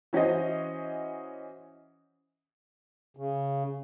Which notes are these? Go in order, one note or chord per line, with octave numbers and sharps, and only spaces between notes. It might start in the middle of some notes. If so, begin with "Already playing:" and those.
E3 C#4 F#4 C5 D#5
C#3